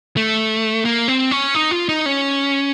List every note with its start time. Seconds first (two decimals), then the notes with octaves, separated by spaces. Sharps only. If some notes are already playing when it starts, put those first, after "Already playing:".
0.17 A3
0.85 A#3
1.08 C4
1.31 C#4
1.55 D#4
1.71 F4
1.89 D#4
2.06 C#4